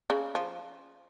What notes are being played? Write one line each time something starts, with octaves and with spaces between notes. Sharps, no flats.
C#3
F3